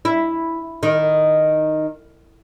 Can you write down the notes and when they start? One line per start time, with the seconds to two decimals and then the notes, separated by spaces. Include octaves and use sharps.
0.05 E4
0.83 D#3